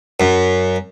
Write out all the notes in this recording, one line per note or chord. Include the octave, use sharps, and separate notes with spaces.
F#2